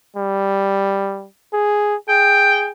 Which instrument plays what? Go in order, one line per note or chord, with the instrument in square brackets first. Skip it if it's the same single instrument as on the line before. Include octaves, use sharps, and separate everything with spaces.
[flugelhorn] G3
G#4
[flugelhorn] G#4 [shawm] G5